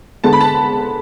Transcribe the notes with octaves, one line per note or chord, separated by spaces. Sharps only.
D3 G#3 B3 A5
B5
A5